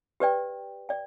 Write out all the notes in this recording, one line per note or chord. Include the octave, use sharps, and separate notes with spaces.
G4 B4 D5 G5
D5 G5